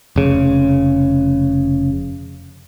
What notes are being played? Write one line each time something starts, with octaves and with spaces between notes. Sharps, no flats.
F1 C#3